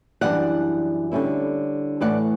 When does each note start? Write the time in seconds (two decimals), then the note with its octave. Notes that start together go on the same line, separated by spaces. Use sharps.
0.21 F#2 E3 G3 D4 D5 F#5
1.12 D3 G3 C#4 E4
2.01 A2 E3 A3 D5 F#5